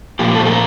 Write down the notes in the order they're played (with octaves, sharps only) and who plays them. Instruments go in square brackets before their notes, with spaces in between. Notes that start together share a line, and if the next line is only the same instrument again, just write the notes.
[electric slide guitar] A#2 F3 A#3 G4
A4
A4
A#4